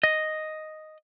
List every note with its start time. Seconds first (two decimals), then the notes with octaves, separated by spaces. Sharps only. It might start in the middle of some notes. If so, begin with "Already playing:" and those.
0.03 D#5